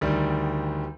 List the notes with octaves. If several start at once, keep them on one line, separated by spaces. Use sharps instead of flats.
D2 D#3 G3